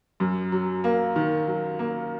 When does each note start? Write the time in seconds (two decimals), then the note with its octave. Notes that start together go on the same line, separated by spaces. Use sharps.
0.20 F#2
0.52 F#3
0.84 A#3
1.16 D#3
1.47 F#3
1.79 A#3